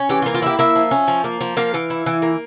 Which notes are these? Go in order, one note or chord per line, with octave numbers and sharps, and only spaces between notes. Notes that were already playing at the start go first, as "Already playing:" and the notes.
Already playing: C#4
E3 G4
F4
A#3
F4
E4 G4
A#3 E5
F3
C#4
F3
A#3
F3
A#3 F5
E3
E4
E3
A#3